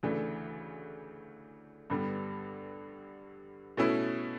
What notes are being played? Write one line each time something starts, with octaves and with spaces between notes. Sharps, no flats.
D2 C#3 E3 A3 D4
G2 D3 G3 B3
B2 A3 C#4 E4